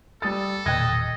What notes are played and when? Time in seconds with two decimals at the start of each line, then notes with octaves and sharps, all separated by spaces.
0.22 G3 A4 D#6 A6
0.66 E1 A#2 D#3 D#5 G5 F#6 G#6